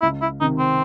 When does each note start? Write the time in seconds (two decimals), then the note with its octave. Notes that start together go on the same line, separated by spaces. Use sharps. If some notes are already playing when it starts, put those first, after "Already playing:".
0.02 C#2 E4
0.21 E4
0.41 C3 D#3 D#4
0.59 C4